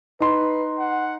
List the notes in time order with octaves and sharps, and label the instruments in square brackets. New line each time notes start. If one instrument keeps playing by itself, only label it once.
[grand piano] D#4 C6 [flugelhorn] B4
[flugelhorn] F#5